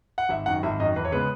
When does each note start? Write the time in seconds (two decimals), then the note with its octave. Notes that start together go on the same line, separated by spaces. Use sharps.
0.18 F#5
0.29 G#1 E5
0.46 F#2 D#3 F#5
0.63 G#1 E5
0.80 F#2 D#3 D#5
0.96 E2 B4
1.05 C#5
1.12 C#3 G#3 B3 B4